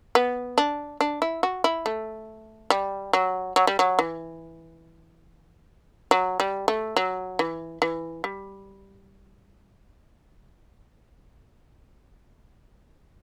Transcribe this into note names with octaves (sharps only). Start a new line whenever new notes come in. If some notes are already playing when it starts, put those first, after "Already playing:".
B3
D4
D4
E4
F#4
E4
A3
G3
F#3
F#3
G3
F#3
E3
F#3
G3
A3
F#3
E3
E3
G3